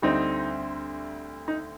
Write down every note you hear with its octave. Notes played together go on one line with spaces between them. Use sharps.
D2 D3 G3 C4 D#4
D#4